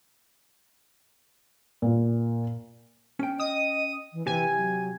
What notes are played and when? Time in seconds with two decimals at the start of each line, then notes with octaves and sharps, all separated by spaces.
1.82 A#2
3.19 C#4 G5
3.39 D#5 D#6
4.13 E3
4.27 C3 E3 G4 G#5
4.56 F#3